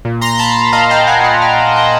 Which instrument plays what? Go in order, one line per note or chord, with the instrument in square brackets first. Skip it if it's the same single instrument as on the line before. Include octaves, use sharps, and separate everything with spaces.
[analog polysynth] A#2
A#5 C6
A5 B5
D#5 F5
F5 G5
F#5 G#5
F#5 G#5
F5 G5
F5 G5
G5 A5